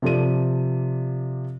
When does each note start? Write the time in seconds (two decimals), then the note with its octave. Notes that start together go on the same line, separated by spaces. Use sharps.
0.02 C3 F3 A4 D5 D#7